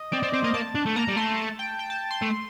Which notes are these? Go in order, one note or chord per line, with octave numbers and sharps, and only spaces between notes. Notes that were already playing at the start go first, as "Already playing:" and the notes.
Already playing: D#5
C4 D5
C4 D5
C4 C5
A#3 D#5
A#3 A5
D4
A3
A#3 A#5
G3
A3 C6
A5
G5
G5
A5
C6
A3